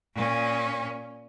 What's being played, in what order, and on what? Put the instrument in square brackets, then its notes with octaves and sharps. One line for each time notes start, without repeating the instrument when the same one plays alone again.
[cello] A#2 C#4